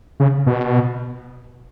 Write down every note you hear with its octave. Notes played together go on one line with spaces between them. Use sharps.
C#3
B2